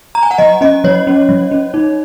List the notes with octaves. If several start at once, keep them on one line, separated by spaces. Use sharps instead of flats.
A#5
G#5
F#5
F#3 D#5
C#4 D#5
F#3 C#5
C#4
F#3
C#4
D#4